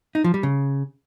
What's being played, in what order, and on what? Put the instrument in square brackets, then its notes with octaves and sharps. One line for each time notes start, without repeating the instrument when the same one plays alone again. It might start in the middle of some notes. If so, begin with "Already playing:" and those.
[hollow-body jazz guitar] D#4
F3
G3
C#3